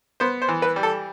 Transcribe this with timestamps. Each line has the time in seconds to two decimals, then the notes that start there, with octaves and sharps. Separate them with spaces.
0.20 B3 C5
0.42 C5
0.48 E3
0.62 B4
0.76 G3
0.83 A4